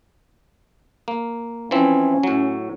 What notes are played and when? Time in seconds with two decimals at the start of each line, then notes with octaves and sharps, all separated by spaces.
1.08 A#3
1.71 E3 F3 C4 C#4
2.23 A2 F#3